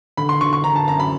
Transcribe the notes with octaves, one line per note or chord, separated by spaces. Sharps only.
D3 B5
C6
D3 C#6
C#6
D3 A#5
A5
F#2 A#5
B5